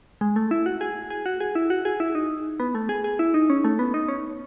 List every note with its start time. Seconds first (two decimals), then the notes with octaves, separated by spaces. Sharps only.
0.21 G#3
0.36 A3
0.51 E4
0.66 F#4
0.81 G#4
1.10 G#4
1.26 F#4
1.40 G#4
1.55 E4
1.70 F#4
1.85 G#4
2.00 E4
2.15 D#4
2.60 B3
2.75 A3
2.89 G#4
3.04 G#4
3.19 E4
3.34 D#4
3.50 C#4
3.64 A3
3.79 B3
3.94 D#4
4.08 C#4